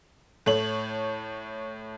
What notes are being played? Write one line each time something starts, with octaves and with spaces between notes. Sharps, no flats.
A2 A3 C#5 F#7